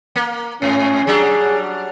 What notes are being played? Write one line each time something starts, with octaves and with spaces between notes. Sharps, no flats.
A#3
G#2 C#4
F#3 G3 D4 G#4